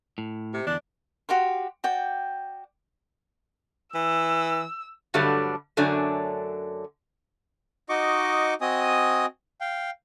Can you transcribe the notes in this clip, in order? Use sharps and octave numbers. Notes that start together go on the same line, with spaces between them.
A2
C3
E2 D3 D4
F#4 G4 F5 C6
F#4 D5 G5
E3 E6
G2 D3 F#3 G3 A3 D4
F#2 D3 F#3 A3 D4 G#5
D#4 F#4 D#5 C#6 D6
C4 F#4 D#5 G#5 D#6
F5 G5